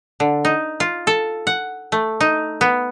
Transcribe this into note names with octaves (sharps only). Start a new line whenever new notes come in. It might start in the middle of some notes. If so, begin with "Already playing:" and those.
D3
D#4
F4
A4
F#5
A3
D#4
B3